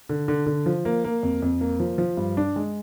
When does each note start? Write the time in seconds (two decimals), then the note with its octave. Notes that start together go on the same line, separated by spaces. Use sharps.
0.09 D3
0.28 D3
0.46 D3
0.66 F3
0.85 A#3
1.04 A#3
1.23 F2
1.42 F2
1.61 A#3
1.79 F3
1.98 F3
2.17 G2
2.37 D4
2.56 G#3